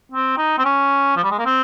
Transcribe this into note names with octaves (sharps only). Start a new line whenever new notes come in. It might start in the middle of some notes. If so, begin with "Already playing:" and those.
C4
D#4
C4
C#4
F3
G3
G#3
A#3
C4